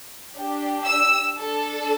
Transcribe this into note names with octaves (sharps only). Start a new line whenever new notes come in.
D4 G4
E6
D4 A4